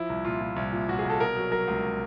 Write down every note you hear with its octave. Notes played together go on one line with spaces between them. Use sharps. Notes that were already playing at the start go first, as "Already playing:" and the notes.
Already playing: F3 E4
C2
A#2 F4
A#2
C2
A#2
A#2 F#4
G#4
C2
A4
B2 A#4
F#3
F#3 A#4
C#2